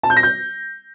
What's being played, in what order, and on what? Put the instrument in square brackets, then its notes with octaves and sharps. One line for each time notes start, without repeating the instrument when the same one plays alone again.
[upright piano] A5
G6
A#6
G6